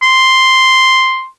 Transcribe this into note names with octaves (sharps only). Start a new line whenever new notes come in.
C6